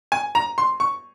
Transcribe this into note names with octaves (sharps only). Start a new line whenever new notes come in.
G#5
A#5
C6
C#6